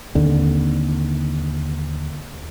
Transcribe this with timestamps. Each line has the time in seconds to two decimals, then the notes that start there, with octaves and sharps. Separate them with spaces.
0.15 D#2 D3 C4